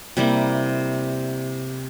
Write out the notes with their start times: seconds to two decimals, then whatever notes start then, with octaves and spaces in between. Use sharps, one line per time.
0.17 C3 G3 A#3 E4